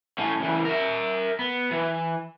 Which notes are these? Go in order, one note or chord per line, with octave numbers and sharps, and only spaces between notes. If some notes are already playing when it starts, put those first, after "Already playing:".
A2 C#4
C#3 E3
A#4 E5
B3
E3